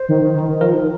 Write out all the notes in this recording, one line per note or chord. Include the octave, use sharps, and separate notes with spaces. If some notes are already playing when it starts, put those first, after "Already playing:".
Already playing: C5
D#3
D#3
D#3
D#3
F3 A#4
D#3